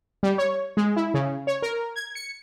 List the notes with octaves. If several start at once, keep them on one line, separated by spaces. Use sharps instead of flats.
G3
C#5
G#3
E4
C#3
C#5
A#4
G#6
C#7